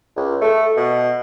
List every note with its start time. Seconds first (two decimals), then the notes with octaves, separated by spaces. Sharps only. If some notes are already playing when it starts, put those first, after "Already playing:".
0.17 C#2
0.41 A3
0.77 B2